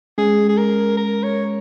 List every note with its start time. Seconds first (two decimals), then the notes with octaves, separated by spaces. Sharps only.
0.18 G#3 C#4 G#4
0.49 G#4
0.57 A#4
0.97 A#4
1.23 C#5